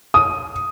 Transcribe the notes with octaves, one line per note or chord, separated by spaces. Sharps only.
D#6